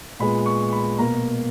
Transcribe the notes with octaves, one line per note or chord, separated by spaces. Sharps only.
A#2 G#3 B3 B5
C#6
B5
B2 A#3 A#5